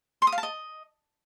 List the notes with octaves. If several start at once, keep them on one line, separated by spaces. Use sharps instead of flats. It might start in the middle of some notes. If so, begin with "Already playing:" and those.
C6
D#6
F5
A5
D#5